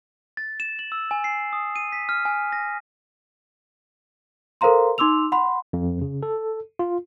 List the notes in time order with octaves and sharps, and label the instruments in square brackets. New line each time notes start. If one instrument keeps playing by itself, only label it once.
[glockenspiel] A6
E7
F#7
E6
G#5
C7
D#6
D#7
B6
F6
G#5
A#6
[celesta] A4 A#4 C5 F5 A#5 C6
D#4 C6 D6 E6 F7
F#5 B5 C6
[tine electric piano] F2
C#3
A4
F4